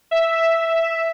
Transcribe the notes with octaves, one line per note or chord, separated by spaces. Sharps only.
E5